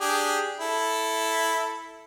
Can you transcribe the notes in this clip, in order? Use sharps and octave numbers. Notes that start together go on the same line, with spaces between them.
D4 G4 G#4
E4 A4